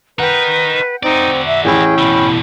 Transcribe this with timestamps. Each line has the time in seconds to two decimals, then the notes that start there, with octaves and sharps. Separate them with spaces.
0.19 D#4 A#4 B4 F#5 G5
1.03 C4 D#4 F#4 D5
1.47 E5
1.65 A1 C#4 E4 G#4 G5
1.98 B2 D3 B5